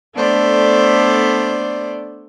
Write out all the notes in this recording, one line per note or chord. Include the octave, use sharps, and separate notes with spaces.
A3 B3 D4 A4 C5 D5